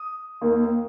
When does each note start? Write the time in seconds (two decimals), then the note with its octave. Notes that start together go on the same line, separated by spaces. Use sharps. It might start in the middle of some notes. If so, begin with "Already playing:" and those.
Already playing: D#6
0.41 D#2 D#3 A#3